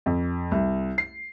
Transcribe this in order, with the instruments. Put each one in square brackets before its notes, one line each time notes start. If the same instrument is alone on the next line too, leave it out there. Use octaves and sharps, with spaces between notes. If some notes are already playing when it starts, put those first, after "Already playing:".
[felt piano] F2
C2
C7